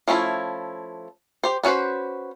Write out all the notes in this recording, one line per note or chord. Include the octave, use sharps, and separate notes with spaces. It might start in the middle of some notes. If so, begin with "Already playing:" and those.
F3 A3 C#4 E4
G4 C5
B3 C#4 F#4 B4 C5